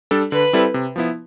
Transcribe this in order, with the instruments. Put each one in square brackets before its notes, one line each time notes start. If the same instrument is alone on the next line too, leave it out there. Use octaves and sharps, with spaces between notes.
[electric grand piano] G3 D4 A4
[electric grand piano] D3 [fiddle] B4
[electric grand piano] G3 C4 E4 A4
C3
F3 B3 E4